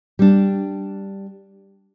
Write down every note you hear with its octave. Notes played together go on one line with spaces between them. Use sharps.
G3 D4